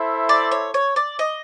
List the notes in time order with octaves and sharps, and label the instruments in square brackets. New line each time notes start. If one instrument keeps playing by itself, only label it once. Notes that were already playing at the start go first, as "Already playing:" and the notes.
Already playing: [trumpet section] E4 A4 C5 E5
[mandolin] D5
C#5
C#5
D5
D#5